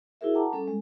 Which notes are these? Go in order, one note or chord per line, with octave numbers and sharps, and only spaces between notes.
E4 F#4 G#4 A#4 E5
F#5 G5 A5 A#5 D6
G3 C#4 A4
G#3